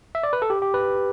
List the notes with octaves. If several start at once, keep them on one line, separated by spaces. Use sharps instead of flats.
E5
D5
B4
A4
G4
G4
B4